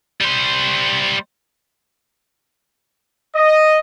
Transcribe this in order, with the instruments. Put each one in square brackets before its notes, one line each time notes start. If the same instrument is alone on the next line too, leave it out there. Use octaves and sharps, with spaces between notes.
[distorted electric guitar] G3 C5
[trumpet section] D#5